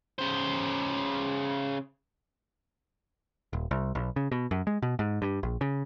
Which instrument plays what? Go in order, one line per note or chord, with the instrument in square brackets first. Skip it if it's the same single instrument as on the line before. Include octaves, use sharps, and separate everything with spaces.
[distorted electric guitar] C#3 C5
[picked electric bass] D#1
C2
B1
C#3
B2
F#2
G#3
B2
G#2
G2
A#1
C#3